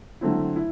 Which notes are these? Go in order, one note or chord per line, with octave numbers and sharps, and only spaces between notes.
D3 F#3 A3 C4 E4
E4